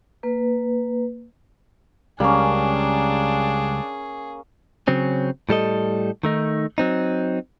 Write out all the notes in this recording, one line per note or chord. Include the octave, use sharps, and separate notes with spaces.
A#3 B4
C#2 G3 A#3 C#4 D4 G#4
C#3 F#3 C4 C#4
A2 G3 A4 D#5
D#3 A3 D#4
F#3 C4 D#4